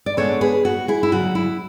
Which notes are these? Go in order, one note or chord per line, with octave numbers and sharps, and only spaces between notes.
D5
C#3 G#3 B3 D4 A4 C#5
G#4 B4
F#4
E4 G#4
E4
D2 C#3 F#3 F#4
E4